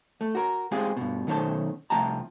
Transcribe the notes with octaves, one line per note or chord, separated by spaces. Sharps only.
A3
F#4 A#4
G#3 C4 F4 G4 G#4
G2 B2
B1 D#3 A3 C#4 C5 A5
C2 F3 A3 G5 A5 A#5